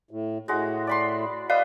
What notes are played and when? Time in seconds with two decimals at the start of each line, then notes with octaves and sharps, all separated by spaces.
0.11 A2
0.48 A2 G#3 F#4
0.87 D5 B5 C6
1.50 B4 D5 D#5 F5